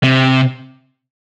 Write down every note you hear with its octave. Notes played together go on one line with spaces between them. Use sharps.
C3